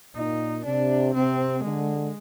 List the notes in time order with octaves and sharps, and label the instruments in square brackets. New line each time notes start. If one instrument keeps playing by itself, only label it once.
[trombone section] A#2 [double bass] D#4
[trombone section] C3 [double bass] D4
[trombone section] C3 [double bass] C4
[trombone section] D3 [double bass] G#3